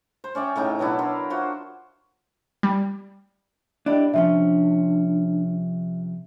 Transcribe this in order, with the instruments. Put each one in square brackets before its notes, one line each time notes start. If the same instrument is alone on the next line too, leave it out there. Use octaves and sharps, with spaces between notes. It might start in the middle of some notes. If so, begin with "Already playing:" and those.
[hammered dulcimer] C5
C#4 D5 E5 G5
A2 C#3 D#4 G5
B2 F#3 D4 E4
A#4 C6
F4 F#4 C5
[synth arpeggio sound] G3
[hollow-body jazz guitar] D4 E4 G4 [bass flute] D#5
[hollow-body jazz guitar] C3 F3 C#4 [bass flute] D4 [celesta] E5